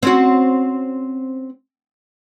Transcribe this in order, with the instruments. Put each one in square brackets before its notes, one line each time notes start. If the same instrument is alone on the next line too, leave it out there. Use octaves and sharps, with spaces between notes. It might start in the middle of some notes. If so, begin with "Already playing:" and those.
[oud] C4 C#4 F#4